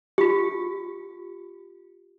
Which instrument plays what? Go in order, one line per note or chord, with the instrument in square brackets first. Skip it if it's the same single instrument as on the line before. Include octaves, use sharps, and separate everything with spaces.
[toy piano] F4 G4